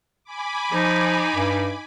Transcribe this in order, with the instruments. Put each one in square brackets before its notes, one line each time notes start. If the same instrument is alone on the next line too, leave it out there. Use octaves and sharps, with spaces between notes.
[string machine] G#5 B5 D6
[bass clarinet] F3 [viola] D#4
[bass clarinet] G2